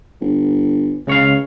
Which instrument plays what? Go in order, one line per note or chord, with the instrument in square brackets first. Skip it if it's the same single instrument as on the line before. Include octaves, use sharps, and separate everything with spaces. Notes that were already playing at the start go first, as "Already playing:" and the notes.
[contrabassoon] G1
[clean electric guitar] C#2 C#5 F5 [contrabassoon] C#3